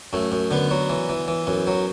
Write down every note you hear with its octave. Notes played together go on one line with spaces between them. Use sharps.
F#2 A3
F#2
D3 B3
F#3
E3
E3
E3
F#2
F#3